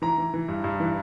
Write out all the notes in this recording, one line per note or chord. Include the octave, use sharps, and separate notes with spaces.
E3 A#5
E3
E3
G2
G2
E3